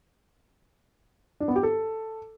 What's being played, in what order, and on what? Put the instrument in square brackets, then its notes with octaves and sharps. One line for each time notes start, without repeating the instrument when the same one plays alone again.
[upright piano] D4
B3
G4
A4